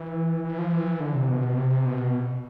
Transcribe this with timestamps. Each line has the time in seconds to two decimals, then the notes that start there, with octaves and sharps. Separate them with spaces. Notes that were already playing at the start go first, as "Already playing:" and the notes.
Already playing: E3
0.44 E3
0.58 F3
0.72 E3
1.00 D3
1.15 C3
1.29 B2
1.57 C3
1.86 B2